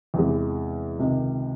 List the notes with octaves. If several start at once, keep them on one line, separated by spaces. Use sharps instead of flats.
E2 C3 E3 G#3
C#2 C3 D#3